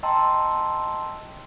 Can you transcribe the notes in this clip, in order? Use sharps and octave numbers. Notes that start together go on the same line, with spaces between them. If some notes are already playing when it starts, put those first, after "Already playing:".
D#5 G5 A5 A#5 C6 E6